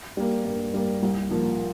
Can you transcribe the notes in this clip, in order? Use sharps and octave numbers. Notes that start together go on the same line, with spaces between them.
G3 A#3
G2
G3 A#3
C2
A#2 F3 A#3